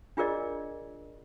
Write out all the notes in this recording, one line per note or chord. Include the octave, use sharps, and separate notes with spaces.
D4 F4 G#4 A#4 D5 D#5